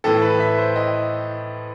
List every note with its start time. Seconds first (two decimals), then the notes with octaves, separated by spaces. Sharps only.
0.04 A2 E3 A4
0.22 B4
0.40 E5
0.58 C5
0.76 D#5